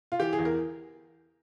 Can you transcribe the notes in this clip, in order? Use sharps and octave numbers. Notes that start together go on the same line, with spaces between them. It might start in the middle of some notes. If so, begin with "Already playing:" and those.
F4
E3 G4
G#4
E2
A#4